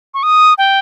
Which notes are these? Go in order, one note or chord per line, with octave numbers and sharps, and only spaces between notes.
C#6
D#6
G5